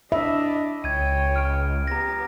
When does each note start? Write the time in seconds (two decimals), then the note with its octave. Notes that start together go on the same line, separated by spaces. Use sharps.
0.12 D4 D#5 E5 B5
0.84 C#2 C#5 G5 G#6 D#7
1.36 F6 D7
1.87 B3 G4 A#5 A#6